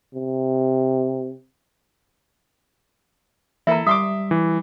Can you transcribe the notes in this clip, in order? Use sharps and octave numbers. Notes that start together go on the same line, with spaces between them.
C3
E3 A#3 E4 A4 E5 A#5
G3 E5 C6 D6 D#6
E3